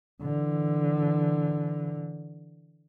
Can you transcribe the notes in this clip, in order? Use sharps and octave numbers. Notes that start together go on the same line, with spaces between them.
D3 E3